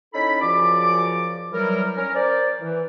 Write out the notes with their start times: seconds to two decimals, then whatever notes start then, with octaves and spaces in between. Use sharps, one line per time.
0.14 C#4 D#4 E4 A4 B5
0.41 F#2 C#3 F3 F4 D5 D6
1.52 E3 F#3 G3 A#4
1.97 C#4 A#4
2.15 A#4 C5 D5
2.61 E3